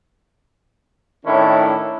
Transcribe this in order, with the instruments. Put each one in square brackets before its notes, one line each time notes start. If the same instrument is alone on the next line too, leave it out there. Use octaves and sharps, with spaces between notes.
[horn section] A2 D#3 C#4 D4 E4